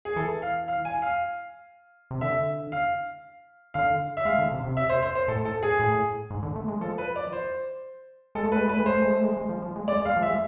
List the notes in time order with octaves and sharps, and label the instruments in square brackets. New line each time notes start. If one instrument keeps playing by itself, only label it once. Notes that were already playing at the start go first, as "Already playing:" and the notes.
[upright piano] G#4
[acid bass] E3 [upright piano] A4
[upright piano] F5
F5
G#5
F5
[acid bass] C3
[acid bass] D3 [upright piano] E5
[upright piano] F5
[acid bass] D3 [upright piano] F5
[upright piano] E5
[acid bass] G#3 [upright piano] F5
[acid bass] D3
C3
C3
[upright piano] E5
C5
C5
C5
[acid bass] A2 [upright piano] A4
[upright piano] A4
G#4
[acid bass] A2
G#2
D3
A3
G#3
[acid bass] F3 [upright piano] A4
[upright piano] B4
D5
C5
[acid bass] G#3 [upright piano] A4
[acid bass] A3
[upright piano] B4
[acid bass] G#3
[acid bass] A3 [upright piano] B4
[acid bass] G#3
[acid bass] A3 [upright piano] C5
[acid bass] G#3
A3
G#3
G#3
F3
F3
G#3
[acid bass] G#3 [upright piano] D5
[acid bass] G#3
[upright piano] F5
[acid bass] F3
[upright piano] E5
[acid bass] G#3